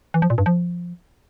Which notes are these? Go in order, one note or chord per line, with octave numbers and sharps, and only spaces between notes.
E3
F3
A#2
G2
F3